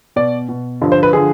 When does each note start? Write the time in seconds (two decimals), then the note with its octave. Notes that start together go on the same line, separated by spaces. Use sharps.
0.16 B2 D5
0.49 B2
0.81 G2 D3 F3
0.92 C5
1.03 B4
1.13 D3 F3 G#4